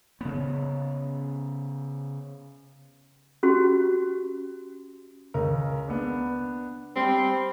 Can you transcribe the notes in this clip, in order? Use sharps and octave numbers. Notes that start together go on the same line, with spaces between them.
C#3 B3
C#4 F#4 G4
C#2 A#4
B3 D4
G3 C4